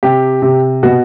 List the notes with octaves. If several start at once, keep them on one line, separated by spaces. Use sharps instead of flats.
C3 G4
C3
B2 F#4